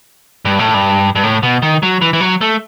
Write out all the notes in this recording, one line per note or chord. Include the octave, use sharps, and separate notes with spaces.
G2
A2
G2
G2
A2
B2
D#3
F#3
E3
E3
F#3
A3